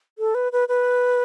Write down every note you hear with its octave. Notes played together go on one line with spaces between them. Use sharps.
A4
B4
B4
B4